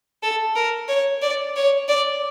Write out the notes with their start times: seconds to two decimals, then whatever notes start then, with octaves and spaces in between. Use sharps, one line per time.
0.23 A4
0.56 A#4
0.89 C#5
1.22 D5
1.56 C#5
1.88 D5